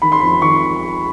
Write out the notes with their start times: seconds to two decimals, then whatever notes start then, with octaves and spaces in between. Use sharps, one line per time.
0.02 D#3 B5
0.12 C6
0.20 F2 B5
0.41 D#3 C#6